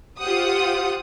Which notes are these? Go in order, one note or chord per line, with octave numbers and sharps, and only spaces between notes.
F4 G4 C5 F#5 D#6